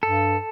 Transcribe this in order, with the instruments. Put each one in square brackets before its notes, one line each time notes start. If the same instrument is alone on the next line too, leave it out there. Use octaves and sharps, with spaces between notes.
[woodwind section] G2 [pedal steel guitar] A4